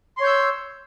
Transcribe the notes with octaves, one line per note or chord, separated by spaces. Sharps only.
C#5 C6 E6 G6